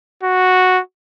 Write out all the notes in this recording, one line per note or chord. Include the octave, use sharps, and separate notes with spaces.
F#4